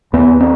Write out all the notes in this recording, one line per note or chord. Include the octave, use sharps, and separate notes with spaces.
D#2 B3
C4